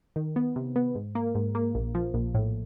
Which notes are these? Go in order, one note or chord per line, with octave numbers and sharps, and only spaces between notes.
D#3
B3
C3
B3
G#2
A#3
G#2
A#3
A#1
F3
A#1
A2